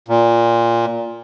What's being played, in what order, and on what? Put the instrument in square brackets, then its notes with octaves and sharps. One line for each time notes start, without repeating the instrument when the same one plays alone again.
[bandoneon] A#2